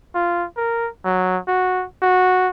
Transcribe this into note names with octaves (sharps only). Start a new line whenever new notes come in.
F4
A#4
F#3
F#4
F#4